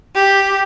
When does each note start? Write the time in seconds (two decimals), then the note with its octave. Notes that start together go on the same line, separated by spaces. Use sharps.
0.16 G4